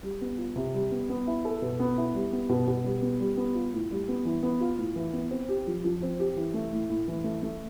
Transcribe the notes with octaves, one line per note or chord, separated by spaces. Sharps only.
G3
B3
F4
C3
G3
B3
B3
E4
A4
B2
B3
E4
G3
B3
B2
B2
G3
B3
G3
B3
F4
A2
G3
B3
E3
B3
F4
A2
E3
B3
C4
G4
F3
F3
C4
G4
E3
A3
A2
A2
E3
A3
A3